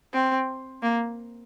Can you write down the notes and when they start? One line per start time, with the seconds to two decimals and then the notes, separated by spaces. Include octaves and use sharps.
0.13 C4
0.83 A#3